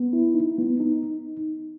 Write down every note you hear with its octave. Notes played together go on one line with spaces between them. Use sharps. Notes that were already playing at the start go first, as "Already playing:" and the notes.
Already playing: B3
E4
D#4
B3
D#4